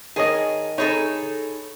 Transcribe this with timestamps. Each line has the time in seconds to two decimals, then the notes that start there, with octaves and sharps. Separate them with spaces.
0.16 D#3 G#4 A#4 C#5 D#5 A5
0.78 D#4 G#4 A4 C#5 B5